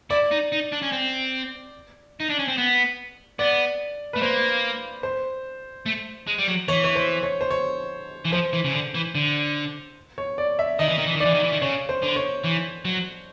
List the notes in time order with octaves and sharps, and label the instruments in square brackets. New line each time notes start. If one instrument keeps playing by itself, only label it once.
[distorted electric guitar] E4 [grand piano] D5
[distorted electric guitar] D#4
D#4
D4
C#4
C4
D#4
D4
C#4
C4
B3
[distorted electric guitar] B3 [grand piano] D5
[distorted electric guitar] A3 [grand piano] B4
[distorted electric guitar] A#3 [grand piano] C5
[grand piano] C5
[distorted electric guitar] A3
G#3
G3
F#3
[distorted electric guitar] E3 [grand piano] C#5
[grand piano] C#5
C5
C#5
C5
C#5
[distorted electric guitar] E3
[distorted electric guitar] F3 [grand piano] C5
[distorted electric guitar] E3
C#3
D3
E3
D3
[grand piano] C#5
D5
E5
[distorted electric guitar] D#3 [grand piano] D#5
[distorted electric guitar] E3
D#3
E3
D#3
[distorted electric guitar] E3 [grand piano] D5
[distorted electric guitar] D#3
E3
D#3
[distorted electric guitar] C#3 [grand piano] C#5
[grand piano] C5
[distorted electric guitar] D3
[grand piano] C#5
[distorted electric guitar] E3
F#3